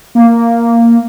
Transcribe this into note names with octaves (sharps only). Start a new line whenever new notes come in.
A#3